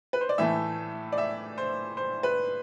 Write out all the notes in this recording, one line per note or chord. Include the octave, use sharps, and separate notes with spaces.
B4
C5
D5
A2 E3 A3 E5
D5
E5
C5
C5
B4